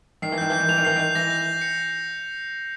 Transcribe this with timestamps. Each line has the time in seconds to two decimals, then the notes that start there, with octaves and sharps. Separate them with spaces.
0.22 D#3 C7
0.32 E3
0.38 D#3 G6
0.50 E3 G6
0.59 D#3
0.69 E3 F7
0.78 D#3
0.85 E3 C7
0.96 D#3
1.00 G6
1.15 E3 A#6
1.30 G6
1.46 G6
1.61 C#7